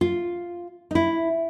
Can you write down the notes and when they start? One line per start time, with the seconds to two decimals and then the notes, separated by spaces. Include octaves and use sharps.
0.01 F4
0.91 D#4
0.95 E4